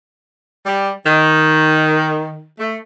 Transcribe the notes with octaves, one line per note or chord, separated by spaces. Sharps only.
G3
D#3
A3